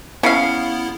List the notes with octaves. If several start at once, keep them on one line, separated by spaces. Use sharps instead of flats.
C#3 B3 E4 F5